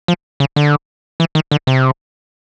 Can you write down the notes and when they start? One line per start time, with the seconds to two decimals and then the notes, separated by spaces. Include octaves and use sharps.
0.08 F3
0.40 C#3
0.56 D3
1.20 E3
1.35 D#3
1.51 D3
1.67 C3